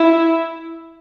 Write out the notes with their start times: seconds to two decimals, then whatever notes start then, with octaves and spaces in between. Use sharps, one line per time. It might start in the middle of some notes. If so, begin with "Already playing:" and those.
Already playing: E4